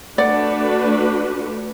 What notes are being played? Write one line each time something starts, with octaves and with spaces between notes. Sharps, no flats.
A3 D4 F#4 B4 D5 F#5